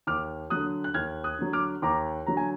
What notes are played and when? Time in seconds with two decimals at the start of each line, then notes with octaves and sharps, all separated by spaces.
0.07 D#2 D6 F6
0.50 D3 F#3 D#6 F#6
0.84 F#6
0.94 D#2 F6 G#6
1.24 D#6 F#6
1.38 D3 F#3
1.53 D6 F6
1.82 D#2 A#5 D6
2.26 D3 F#3 A#5
2.37 G#5